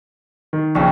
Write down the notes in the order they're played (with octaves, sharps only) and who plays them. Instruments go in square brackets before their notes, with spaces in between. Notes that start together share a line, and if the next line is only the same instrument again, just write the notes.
[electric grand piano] D#3
[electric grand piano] A#1 C#3 [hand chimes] G5 C#6